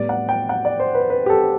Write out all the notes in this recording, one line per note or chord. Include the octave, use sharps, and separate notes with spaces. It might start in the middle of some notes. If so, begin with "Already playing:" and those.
Already playing: A2 G3 B3 D5
F#5
G5
F#5
D5
C5
B4
B4
G4
A4